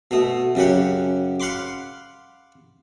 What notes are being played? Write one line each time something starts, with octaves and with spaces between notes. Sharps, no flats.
B2 A3 D#6
F#2 C#3 G4 F#5
F5 F#5 B5 C6 D6